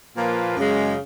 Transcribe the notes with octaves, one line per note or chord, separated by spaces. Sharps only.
A#2 F3 A#3 F4 B4
F#2 C#3 G#3